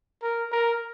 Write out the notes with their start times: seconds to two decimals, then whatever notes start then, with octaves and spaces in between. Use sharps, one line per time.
0.22 A#4
0.52 A#4